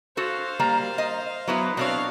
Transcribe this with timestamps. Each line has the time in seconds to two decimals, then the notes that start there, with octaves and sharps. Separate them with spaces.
0.17 F#4 A4 C5 F5
0.59 G3 A#3 A#5
0.98 D#5
1.47 F#3 B3 E4
1.77 B2 C4 D4 C#5 F5